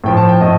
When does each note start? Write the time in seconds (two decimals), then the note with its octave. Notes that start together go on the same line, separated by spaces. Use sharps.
0.04 A2 F3 G5
0.17 A5
0.29 G5
0.41 A2 D#5